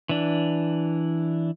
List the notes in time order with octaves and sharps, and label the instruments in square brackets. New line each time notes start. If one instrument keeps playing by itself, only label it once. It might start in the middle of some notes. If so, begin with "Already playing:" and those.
[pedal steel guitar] E3 D4